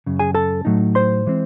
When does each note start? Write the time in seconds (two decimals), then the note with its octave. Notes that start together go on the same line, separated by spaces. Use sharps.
0.06 F#2 C#3
0.19 G#4 G#5
0.34 A4 A5
0.65 A2 F#3 A3 D#4
0.95 C5 C6
1.27 E3 G#3 C4